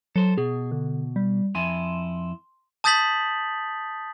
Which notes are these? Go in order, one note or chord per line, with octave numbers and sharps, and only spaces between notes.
F#3 A4 C5
B2 G#4
D3
G3
F2 E4 G#5 C6
A5 D#6 G6 A6 B6 F#7